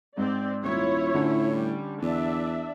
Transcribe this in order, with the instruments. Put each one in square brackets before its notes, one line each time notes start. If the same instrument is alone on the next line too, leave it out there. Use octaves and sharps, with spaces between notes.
[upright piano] G#2 [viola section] C4 D5
[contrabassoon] D#1 [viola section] E4 F4 C#5
[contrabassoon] A2 [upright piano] D3 C#4
[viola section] G3
[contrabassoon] E2 [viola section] D4 D5 E5